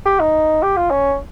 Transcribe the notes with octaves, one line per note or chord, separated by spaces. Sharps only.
G4
D#4
G4
F4
C#4